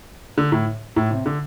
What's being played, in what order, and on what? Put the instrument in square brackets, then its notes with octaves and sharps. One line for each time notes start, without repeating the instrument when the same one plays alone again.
[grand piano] D3
A2
A2
C3
D3